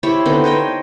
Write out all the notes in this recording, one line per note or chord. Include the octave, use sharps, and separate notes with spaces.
E4 G4 C5 C#5
D3 B3 C4 D#4
C5 C#5 D#5 G5